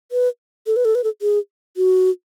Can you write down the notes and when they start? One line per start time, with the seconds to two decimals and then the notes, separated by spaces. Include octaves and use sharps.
0.12 B4
0.67 A4
0.76 B4
0.85 A4
0.95 B4
1.04 A4
1.22 G#4
1.77 F#4